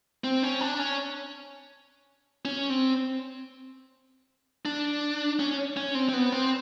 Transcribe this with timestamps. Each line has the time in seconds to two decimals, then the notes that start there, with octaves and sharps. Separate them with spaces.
0.24 C4
0.43 C#4
0.61 D4
0.79 C#4
2.45 C#4
2.70 C4
4.65 D4
5.39 C#4
5.77 C#4
5.95 C4
6.09 C4
6.13 B3
6.32 C4